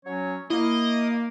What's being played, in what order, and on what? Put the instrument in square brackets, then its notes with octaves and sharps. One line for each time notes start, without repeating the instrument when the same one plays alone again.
[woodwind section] F#3 C#4 C#5
[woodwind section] A#3 [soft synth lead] E4 [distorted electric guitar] D#5